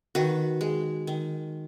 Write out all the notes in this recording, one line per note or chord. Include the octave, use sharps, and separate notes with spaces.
D#3 F#4 B4
G#3
D#3